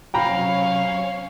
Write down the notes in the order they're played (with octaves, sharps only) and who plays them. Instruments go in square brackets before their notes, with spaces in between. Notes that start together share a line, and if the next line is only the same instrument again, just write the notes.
[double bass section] C3 F#3 [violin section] C#4 C#5 [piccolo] F5 [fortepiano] G5 A#5 B5